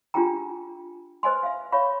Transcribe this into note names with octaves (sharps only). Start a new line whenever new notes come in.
D4 F4 G4 G#4 G5 A#5
B4 C5 D#5 G#5 C6
E5 F5
C#5 E5 F5 B5 C#6